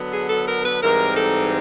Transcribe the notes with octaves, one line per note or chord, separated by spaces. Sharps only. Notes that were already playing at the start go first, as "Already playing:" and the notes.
Already playing: D3 F#3 B3
G#4
A4
A#4
B4
G#2 E3 G3 C4 D#4 A#4
A4